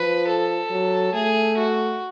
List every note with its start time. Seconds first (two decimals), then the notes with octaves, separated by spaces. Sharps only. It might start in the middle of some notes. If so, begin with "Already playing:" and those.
Already playing: F3 B4
0.27 A4
0.70 F#3
1.13 A3 G#4
1.57 F#4